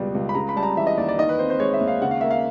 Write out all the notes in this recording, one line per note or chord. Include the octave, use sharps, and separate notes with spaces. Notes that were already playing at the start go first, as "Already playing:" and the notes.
Already playing: C#2 B2 G3
C#2
B5
C#3 A#5
B5
G3 A5
A#5
E3 E5
D#5
D#2 D5
D5
D#3 D#5
B4
C4 C5
C5
G#3 C#5
E5
D#2
F5
C#3 F#5
F5
A#3 E5
F5